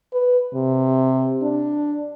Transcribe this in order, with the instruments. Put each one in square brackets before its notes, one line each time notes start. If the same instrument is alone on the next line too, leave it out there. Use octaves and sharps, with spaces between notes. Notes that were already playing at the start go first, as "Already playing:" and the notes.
[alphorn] B4
C3
D4